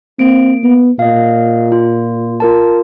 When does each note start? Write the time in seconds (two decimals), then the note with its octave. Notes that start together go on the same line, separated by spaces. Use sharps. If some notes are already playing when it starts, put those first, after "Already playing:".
0.19 A#3 C4 D7
0.64 B3
0.99 A#2 D#5 F5
1.72 F4
2.40 F4 A#4 A5